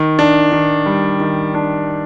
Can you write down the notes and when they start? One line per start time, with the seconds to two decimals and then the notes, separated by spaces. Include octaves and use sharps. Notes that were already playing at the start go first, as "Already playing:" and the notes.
Already playing: D#3
0.19 D4
0.52 D#3
0.86 G3
1.20 D#3
1.54 D4